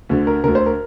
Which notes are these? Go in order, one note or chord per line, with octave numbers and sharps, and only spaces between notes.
D2 D3
A#4
D2 D3 A#4
C5
A#4